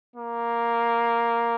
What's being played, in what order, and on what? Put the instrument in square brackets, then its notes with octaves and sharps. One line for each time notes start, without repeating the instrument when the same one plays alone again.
[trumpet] A#3